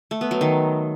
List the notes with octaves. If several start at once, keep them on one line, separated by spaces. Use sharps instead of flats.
A3
B3
F#3
D#3